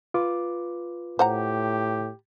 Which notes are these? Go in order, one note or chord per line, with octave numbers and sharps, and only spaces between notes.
F4 B4 D6
A2 G4 C5 F#5 A#5